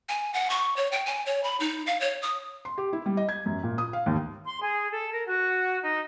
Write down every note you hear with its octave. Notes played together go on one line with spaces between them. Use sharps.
G#5
F#5
C#6
C#5
G5
G#5
C#5
B5
D#4
F5
C#5
D#6
C6
G4
E4
G3
D#5
G#6
F#2
A#2
D#6
F5
D#2
C6
G#4
A4
A#4
F#4
D#4